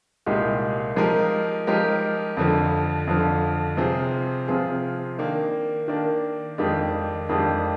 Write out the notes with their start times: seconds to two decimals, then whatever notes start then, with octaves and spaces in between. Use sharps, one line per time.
0.26 C2 A#2 G#3 D#4 G4
0.96 F3 G#3 D#4 G4 A#4
1.67 F3 G#3 D#4 G4 A#4
2.37 F2 D3 F3
3.07 F2 D3 F3
3.77 C3 F3 C4 F4 G#4
4.48 C3 F3 C4 F4 G#4
5.19 D#3 A#3 D4
5.88 D#3 A#3 D4
6.58 F2 D#3 G#3 D4 G4
7.29 F2 D#3 G#3 D4 G4